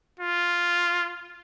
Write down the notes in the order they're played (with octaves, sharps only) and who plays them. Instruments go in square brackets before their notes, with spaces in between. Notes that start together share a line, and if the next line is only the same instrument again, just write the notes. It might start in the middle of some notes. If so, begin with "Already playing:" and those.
[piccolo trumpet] F4